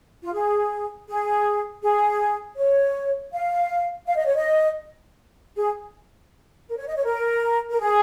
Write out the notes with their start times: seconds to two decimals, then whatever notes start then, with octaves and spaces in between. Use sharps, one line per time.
0.23 F4
0.33 G#4
1.08 G#4
1.82 G#4
2.57 C#5
3.32 F5
4.07 F5
4.17 D#5
4.26 C#5
4.36 D#5
5.56 G#4
6.68 A#4
6.77 C#5
6.87 D#5
6.96 C#5
7.05 A#4
7.70 A#4
7.80 G#4